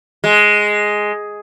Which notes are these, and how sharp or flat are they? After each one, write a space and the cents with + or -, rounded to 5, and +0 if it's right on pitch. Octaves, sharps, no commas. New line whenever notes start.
G#3 +5